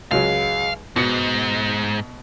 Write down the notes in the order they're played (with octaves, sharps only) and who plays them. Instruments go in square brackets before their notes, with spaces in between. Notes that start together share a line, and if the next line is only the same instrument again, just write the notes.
[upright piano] C#2 F#3 G#3 [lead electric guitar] F5
[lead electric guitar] G#2 [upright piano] B2 C#7